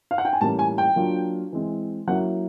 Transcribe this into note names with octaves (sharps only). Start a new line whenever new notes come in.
F5
F#5
G5
G#5
A2 E3 G3 A#3 C#4 A5
G#5
G5
F#3 A#3 D4 F4
E3 G#3 C4
F#3 A#3 C#4 E4 F#5